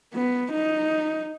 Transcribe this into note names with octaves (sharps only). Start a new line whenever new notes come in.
B3
D#4